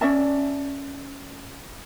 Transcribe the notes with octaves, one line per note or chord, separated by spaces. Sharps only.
C#4 D5 E5 A5